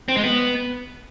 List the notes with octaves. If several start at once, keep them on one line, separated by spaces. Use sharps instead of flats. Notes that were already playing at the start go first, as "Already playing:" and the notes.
C4
G#3
B3